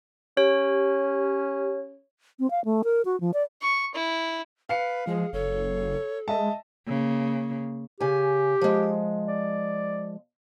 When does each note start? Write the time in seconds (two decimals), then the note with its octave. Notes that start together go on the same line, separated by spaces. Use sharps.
0.37 C#4 G4 C#5
2.39 C4
2.51 F5
2.65 A3
2.84 A#4
3.05 F#4
3.21 F3
3.34 D5
3.62 C#6
3.95 E4
4.69 B4 F5 C7 C#7
5.07 F3 G#3 G#4
5.33 F#1 A4 C#5
6.28 G#3 D#5 E5 A5
6.87 C#3 A#3
8.01 C#3 G4 G#5
8.61 F3 G#3
9.28 D5